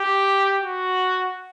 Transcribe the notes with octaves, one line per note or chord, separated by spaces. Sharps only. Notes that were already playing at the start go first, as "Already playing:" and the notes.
Already playing: G4
F#4